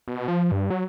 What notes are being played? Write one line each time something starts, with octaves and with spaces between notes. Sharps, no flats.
B2
F3
G2
F#3